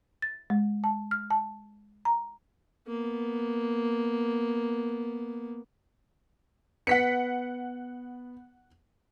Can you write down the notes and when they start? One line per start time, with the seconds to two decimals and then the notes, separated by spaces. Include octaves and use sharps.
0.22 A6
0.50 G#3
0.84 A5
1.11 F6
1.31 A5
2.05 A#5
2.88 A#3 B3
6.87 B3 F#5 B6 C#7